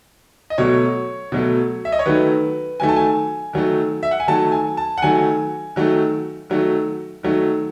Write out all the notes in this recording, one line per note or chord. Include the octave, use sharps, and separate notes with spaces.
D#5
B2 F#3 A3 C#5
B2 F#3 A3
E5
D#5
C#5
D#3 F#3 A3 B4
D#3 F#3 A3 G#5
A5
G#5
D#3 F#3 A3
E5
F#5
G#5
D#3 F#3 A3 A5
G#5
A5
F#5
D#3 F#3 A3 G#5
D#3 F#3 A3
D#3 F#3 A3
D#3 F#3 A3